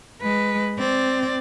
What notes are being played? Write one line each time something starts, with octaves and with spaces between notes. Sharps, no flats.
G#3 B4
C4 D5